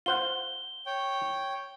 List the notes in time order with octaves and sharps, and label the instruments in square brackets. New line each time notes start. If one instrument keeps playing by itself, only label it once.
[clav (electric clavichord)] F4 C5 F#5 [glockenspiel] G7
[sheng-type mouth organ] C#5 G5